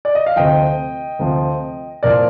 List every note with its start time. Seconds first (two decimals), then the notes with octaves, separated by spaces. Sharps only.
0.05 D5
0.15 D#5
0.26 F5
0.36 D2 C3 F3 D#5 G5
1.19 D2 C3 F3
2.03 C2 A#2 F3 A#4 D5